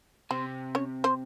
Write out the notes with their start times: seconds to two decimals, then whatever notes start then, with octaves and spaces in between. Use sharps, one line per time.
0.31 C3 C4 C5
0.75 C#4 C#5
1.04 C4 C5